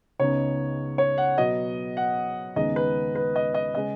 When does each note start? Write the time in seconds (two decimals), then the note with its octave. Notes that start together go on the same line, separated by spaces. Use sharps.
0.19 C#2 C#3 B3 D#4 C#5
0.98 C#5
1.18 F#5
1.37 B2 F#3 B3 D#5
1.97 F#5
2.56 D#2 C#3 G#3 B3 D#4 D#5
2.76 B4
3.15 B4
3.36 D#5
3.54 D#5
3.75 C#3 G#3 C#4 D#5